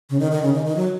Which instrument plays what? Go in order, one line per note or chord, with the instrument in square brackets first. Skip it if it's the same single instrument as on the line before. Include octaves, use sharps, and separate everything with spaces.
[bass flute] C#3
D#3
D#3
C#3
D#3
D#3
F#3